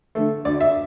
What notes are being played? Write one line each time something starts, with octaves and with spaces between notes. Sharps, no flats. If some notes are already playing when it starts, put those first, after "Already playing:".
D3 A3
D2 D5
E5